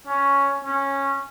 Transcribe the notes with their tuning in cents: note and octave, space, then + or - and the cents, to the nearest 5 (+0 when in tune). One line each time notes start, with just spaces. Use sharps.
C#4 +5
C#4 -10